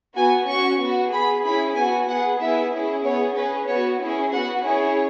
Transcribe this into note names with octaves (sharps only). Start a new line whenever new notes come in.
B3 F#4 G#5
C#4 F#4 C#6
B3 F#4
B3 G#4 B5
C#4 E4 G#4 B5
B3 F#4 G#5
B3 G#4 F#5
B3 E4 G#4 E5
C#4 E4 G#4
B3 G#4 C#5
C#4 G#4 B4
B3 F#4 C#5
C#4 E4 G#4
B3 F#4 F#5
C#4 E4 G#4 C#5